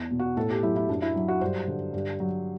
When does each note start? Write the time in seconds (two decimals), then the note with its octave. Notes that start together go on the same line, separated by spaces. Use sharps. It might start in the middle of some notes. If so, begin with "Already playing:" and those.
Already playing: E2
0.11 B2
0.19 F#4
0.37 A2 A4
0.50 G4
0.63 F#3 E4
0.76 E4
0.89 F#2 D4
1.02 E4
1.15 F#3
1.28 F#4
1.41 G2 C5
1.68 D3
1.93 G2
2.20 F#3